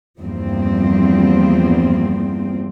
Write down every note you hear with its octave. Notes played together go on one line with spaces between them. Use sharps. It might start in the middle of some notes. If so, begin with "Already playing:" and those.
E2 G2 F3 A#3 C4